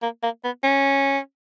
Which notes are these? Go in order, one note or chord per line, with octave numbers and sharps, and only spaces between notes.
A#3
A#3
B3
C#4